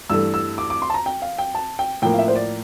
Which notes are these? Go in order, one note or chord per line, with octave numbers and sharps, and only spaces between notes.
G2 E3 A3 E6
E6
D6
D6
C6
A5
A#5
G5
F5
G5
A5
G5
A2 F3 A#3 G5
F5
E5
C5
D5